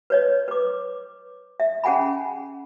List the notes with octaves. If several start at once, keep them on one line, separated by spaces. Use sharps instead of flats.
B4 C#5 D#5
B4 D6
E5
C#4 G#4 F#5 G#5 B5